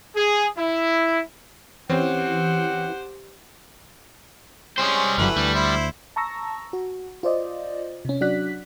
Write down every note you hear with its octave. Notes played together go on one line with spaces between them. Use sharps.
G#4
E4
E3 C4 C#4 G4 C5 F#5
G3 G#3 C#4 C5
G1 F#2 E3 F#3 A3 B4
D2 G3
E4 C5
A5 A#5 C#6 E6 A#6
F#4
F4 C5 D5 D#5
C3 C#4
F#3 D4 F#4 D5 F#6 B6